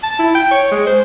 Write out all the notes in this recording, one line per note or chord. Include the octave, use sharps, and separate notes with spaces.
A5
E4
G5
C#5
G#3
C5